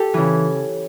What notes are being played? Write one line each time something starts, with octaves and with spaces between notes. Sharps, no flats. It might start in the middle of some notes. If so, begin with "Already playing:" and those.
Already playing: G4 A4
C#3 E3